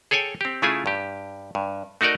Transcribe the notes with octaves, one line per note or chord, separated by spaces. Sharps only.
G#4 A4 C#5 G5 G#5
C4 G4
C#3 A3 E4 F4 G#4 G#5
G2 G4
G2
A3 D#4 F#4 A#4 D5 D#5